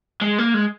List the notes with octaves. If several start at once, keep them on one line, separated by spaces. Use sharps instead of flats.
G#3
A#3
G#3